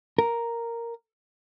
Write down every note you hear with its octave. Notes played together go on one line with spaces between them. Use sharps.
A#4